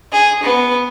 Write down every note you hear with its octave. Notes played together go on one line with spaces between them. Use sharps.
G#4
B3